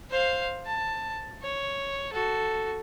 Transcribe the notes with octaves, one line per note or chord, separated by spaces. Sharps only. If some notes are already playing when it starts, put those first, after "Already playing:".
C5 F5
A5
C#5
F#4 A4